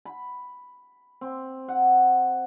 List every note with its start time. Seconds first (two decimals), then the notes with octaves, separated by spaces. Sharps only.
0.05 B5
1.21 C4
1.68 F#5